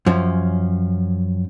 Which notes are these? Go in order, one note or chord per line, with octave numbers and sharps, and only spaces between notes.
F#2 F3 C#4